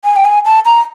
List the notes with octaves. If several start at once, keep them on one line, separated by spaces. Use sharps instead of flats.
G#5
G5
G#5
A5
A#5